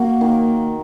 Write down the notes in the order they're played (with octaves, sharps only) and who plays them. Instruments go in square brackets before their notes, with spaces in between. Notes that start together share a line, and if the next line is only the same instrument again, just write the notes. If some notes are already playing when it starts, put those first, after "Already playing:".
Already playing: [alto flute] A#3 [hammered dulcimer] F#4
[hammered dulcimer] D#3